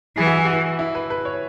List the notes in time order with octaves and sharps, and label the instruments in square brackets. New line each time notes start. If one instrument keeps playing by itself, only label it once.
[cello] E3 [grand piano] G#4
[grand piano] F#4
E4
F#4
E4
B4
B4
C#5